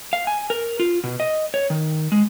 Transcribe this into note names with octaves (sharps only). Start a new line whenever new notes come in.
F5
G#5
A#4
F4
B2
D#5
C#5
D#3
G#3